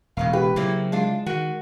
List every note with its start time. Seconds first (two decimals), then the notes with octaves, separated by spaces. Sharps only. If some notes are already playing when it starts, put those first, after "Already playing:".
0.17 E1 C#3 D#5 F5
0.33 G4 B4
0.56 C#3 F#3 A#3 C4 E4
0.92 G#3 D4 F4
1.26 D#3 F#4